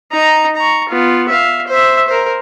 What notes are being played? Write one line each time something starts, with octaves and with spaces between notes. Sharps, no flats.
D#4 A#5
A#5 C#6
B3 F4
E5 F5
C5 E5
A#4 C5